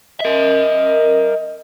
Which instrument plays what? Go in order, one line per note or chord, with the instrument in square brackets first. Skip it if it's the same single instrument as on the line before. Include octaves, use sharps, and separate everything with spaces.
[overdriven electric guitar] A#4 E5 [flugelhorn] D#5